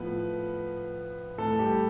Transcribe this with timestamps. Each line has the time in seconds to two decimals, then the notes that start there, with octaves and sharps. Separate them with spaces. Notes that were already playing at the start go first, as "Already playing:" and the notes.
Already playing: A2 F3 B3 B4
1.38 A2 E3 A3 A4
1.59 G3 G4